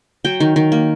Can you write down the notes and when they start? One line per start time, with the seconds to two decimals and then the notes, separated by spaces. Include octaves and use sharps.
0.25 F#3 G5
0.40 D#3
0.56 D#3
0.72 A#3